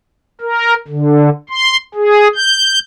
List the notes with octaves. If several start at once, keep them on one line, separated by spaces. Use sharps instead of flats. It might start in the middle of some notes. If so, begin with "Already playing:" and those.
A#4
D3
C6
G#4
G6